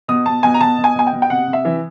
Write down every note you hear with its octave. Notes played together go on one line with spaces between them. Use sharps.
B2 D#6
B2 A5
B2 G#5
A#5
B2 A5
B2
G#5
B2 G#5
G5
B2
G5
C3 F#5
C3
E5
E3